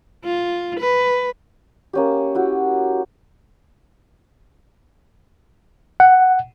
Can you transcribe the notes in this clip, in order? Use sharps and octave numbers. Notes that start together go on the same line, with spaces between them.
F4
B4
A#3 C#4 G4
E4 F#4 G4
F#5